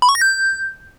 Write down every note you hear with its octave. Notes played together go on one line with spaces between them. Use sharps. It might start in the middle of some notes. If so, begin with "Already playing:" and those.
B5
C#6
A#6
G6